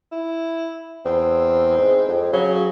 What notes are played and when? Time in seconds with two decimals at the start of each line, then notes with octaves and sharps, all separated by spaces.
0.12 E4
1.05 E2 C4
1.78 G#2
2.09 F2
2.33 C#3 F#3